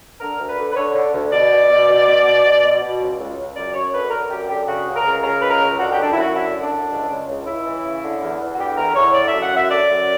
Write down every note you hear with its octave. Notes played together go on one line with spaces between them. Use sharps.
D3 A#4
D2
B4
D3
B4
D3 C#5
D3
D2
B2 D5
B2
B2
B2
B2
B2
B2
B2
B2
C#2
C#2
C#2
F#2 D5
F#2 C#5
D3 B4
D3 A#4
F#2 G4
D3 G4
C#3 F#4
C#2
A#4
C#3
C#3 A#4
C#2 B4
A#4
C#2
D3 F#4
F#2 G4
D4
E4
F#2 F#4
D3 E4
F#2
D4
D3
C#2
C#2
C#2
C#2 E4
E3
C#3
D3
E2
E2
F#4
D3 G4
E2 A#4
E2 C#5
D3 D5
F#2 E5
F#5
F#2
E5
D3 D5
F#2